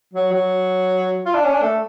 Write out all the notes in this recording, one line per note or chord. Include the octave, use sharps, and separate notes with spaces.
F#3
F#3
F4
D4
C#4
D4
A3